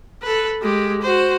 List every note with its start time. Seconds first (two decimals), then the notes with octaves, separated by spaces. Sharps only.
0.22 A4 B4
0.62 G#3 G4
1.02 F#4 C5